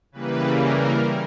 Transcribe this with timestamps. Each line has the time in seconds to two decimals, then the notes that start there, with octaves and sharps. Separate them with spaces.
0.12 C#3 E3 G3 A#3 B4
0.62 A#4